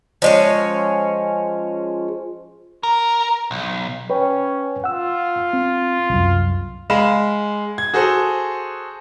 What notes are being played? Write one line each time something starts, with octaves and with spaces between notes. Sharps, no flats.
F3 G#3 C#4
A#4
B1
C#4 B4 C#5 G5
F4 F#5 E6
C4
C2 F#2
G#3 F5 B5 E7
G#6
F#4 G#4 A4 C5